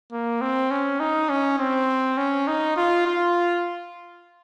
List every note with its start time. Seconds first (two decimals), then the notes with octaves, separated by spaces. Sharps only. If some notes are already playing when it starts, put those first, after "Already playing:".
0.12 A#3
0.41 C4
0.71 C#4
1.00 D#4
1.30 C#4
1.59 C4
2.17 C#4
2.47 D#4
2.77 F4
3.06 F4